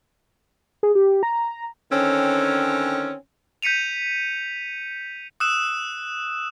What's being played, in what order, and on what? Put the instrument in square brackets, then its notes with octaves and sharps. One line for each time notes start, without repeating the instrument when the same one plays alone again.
[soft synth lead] G#4
G4
A#5
[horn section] D3 D#3 C4 C#4
[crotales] G6 B6 C#7 D#7 F7
D#6 E6 F#6 E7